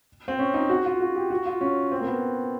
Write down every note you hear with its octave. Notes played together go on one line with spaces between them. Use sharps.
C4
C#4
D#4
F#4
F4
F#4
G4
F#4
F4
C#4
C4
A#3
B3